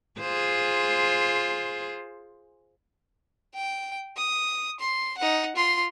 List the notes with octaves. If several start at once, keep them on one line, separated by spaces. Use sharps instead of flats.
F4 G#4 C5
G5
D#6
C6
D#4 F#5
F4 C6